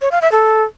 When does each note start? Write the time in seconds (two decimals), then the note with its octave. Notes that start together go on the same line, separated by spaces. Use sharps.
0.02 C#5
0.12 F5
0.22 E5
0.32 A4